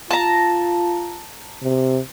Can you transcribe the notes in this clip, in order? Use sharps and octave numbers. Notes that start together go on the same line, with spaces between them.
F4 A5 A#5
C3